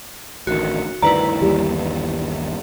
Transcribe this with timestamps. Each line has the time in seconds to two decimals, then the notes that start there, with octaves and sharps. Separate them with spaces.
0.47 A1 D2 D#3 F#4
1.02 D2 G2 D#3 E4 B4 D5 A#5
1.41 G1 D#2 E3 G3